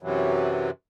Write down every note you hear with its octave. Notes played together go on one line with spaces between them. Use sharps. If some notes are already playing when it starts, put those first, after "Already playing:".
F#2 C3 E3 F#3